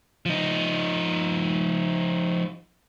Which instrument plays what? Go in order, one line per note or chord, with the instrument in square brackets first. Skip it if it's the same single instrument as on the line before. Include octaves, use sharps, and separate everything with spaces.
[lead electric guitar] F3 D#4